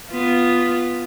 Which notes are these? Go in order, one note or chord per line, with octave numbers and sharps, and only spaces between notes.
B3 F4